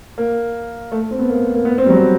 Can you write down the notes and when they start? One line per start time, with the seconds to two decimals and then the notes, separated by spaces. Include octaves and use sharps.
0.18 A#3
0.92 A3
1.11 C4
1.19 B3
1.29 A#3
1.54 A#3
1.65 B3
1.78 C4
1.86 G3
1.90 F#3